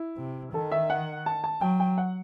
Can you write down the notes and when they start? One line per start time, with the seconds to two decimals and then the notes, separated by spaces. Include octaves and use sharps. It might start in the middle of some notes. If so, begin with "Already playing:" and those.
Already playing: E4
0.17 C3
0.54 D#3 A4
0.72 E5
0.90 F#5
1.26 A5
1.44 A5
1.61 F#3 G5
1.80 G5
1.98 F#5